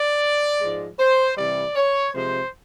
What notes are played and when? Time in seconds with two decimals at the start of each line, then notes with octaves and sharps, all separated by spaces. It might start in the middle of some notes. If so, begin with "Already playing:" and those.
Already playing: D5
0.61 G#2 F3 G#3
0.99 C5
1.37 C3 E3 G3 D5
1.75 C#5
2.13 C3 F3 G#3 C5